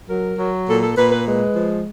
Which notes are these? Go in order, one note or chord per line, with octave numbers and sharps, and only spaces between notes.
F#3 A#4
F#3
A#2 A4
A4
A#2 B4
B4
G#3 B4
F3